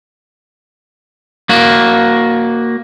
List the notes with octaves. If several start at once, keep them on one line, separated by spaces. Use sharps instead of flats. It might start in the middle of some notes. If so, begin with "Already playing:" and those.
A#3 F#4